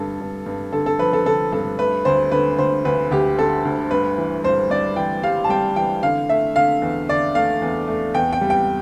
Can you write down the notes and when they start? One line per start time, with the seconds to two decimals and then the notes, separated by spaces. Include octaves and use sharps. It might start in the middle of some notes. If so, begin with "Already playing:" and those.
Already playing: G2 D3 A4
0.20 G2
0.46 G2
0.72 D3 A4
0.86 A4
0.99 F3 B4
1.13 A4
1.26 D3 A4
1.52 G2 A4
1.79 A3 B4
2.05 D2 C5
2.31 D3 B4
2.58 D2 C5
2.85 D2 B4
3.11 D2 G4
3.38 D3 A4
3.65 D2
3.91 G2 B4
4.18 E3
4.44 G2 C5
4.70 G2 D5
4.96 E3 G5
5.23 G3 F5
5.44 A5
5.49 G3 G5
5.76 E3 G5
6.03 D3 F5
6.29 A3 E5
6.56 D3 F5
6.82 E2
7.09 D3 D5
7.35 A3 F5
7.62 E2
7.88 A3
8.14 E2 G5
8.33 G5
8.41 G3
8.50 G5